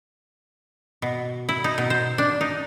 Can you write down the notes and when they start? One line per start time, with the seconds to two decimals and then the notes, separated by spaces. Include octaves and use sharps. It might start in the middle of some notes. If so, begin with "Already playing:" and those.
1.02 B2
1.49 E4
1.64 D#4
1.78 B2
1.90 C5
2.18 D4
2.41 D#4